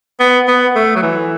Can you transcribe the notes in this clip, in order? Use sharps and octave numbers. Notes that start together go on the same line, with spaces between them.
B3
B3
A3
F#3
E3